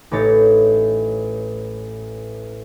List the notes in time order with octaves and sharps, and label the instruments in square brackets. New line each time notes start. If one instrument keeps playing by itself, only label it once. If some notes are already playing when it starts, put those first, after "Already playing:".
[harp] A1 A2 D#4 C#5 A6